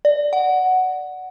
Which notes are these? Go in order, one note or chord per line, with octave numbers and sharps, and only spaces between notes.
D5
F#5